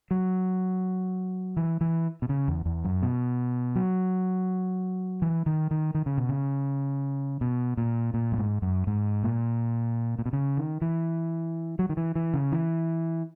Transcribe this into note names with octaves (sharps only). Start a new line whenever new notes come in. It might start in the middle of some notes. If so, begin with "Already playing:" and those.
F#3
E3
E3
B2
C#3
E2
E2
F#2
B2
F#3
E3
D#3
D#3
D#3
C#3
B2
C#3
B2
A#2
A#2
F#2
G#2
F#2
G#2
A#2
A#2
B2
C#3
D#3
E3
F#3
D#3
E3
E3
C#3
E3